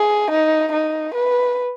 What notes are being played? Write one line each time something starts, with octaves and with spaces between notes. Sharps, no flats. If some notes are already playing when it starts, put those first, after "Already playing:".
Already playing: G#4
D#4
D#4
B4